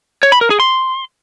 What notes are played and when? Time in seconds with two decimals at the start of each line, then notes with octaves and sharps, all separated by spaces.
0.23 C#5
0.32 B5
0.41 A#4
0.50 G#4
0.60 C6